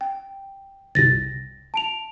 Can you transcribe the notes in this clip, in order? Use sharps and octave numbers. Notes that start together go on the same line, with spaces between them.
G5
G1 C2 A6 A#6
A5 D7 F7